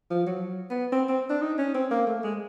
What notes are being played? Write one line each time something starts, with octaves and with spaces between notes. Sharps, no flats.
F3
F#3
B3
C4
C4
D4
D#4
C#4
C4
A#3
A3
G#3